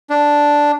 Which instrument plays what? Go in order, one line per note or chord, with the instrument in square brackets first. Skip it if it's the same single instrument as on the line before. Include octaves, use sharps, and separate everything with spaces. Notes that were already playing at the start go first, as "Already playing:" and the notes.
[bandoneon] D4